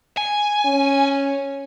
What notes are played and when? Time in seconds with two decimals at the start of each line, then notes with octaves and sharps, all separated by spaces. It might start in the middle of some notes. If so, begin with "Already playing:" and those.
0.17 G#5
0.65 C#4